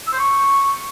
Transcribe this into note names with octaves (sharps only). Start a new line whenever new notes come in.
E6
C5
C#6